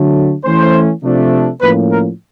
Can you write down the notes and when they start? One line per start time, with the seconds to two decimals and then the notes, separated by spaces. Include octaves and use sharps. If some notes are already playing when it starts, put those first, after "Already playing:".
Already playing: D3 F#3 A3
0.44 E3 A3 C#4 C5
1.02 C3 F3 A3 D4
1.61 A2 F3 A#3 C#4 B4
1.91 A#4